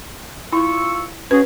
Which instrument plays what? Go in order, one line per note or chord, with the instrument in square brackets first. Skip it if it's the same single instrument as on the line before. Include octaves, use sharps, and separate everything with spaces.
[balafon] E4 [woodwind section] F4 C#6 E6
[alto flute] C#4 [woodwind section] F#4 G#4 [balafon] B4